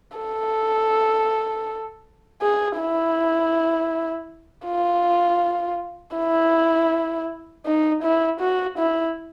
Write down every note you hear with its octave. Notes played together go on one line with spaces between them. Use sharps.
A4
G#4
E4
F4
E4
D#4
E4
F#4
E4